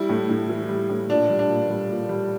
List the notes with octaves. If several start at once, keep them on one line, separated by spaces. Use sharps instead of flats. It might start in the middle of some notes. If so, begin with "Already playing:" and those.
Already playing: G3 E4
A2
A2
E3
G3
A2
A#2 D4
G3
D4
A#2
G3
A#2
G3